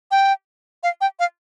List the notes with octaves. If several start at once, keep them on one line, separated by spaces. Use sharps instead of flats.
G5
F5
G5
F5